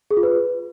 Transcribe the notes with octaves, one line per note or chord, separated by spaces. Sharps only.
G#4
F4
B4